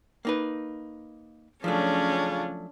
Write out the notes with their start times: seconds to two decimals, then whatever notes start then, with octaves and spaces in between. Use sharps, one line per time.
0.25 A#3 D#4 B4
1.64 C#3 F3 F#3 A3 C#4 D4 F4